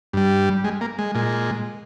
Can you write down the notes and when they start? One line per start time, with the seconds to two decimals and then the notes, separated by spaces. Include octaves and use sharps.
0.13 G2 G3
0.64 G#3
0.81 A#3
0.99 G#3
1.15 A#2 G#3